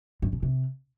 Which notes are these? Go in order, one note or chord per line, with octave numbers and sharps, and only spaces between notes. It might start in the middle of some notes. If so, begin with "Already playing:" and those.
G2
B2
C3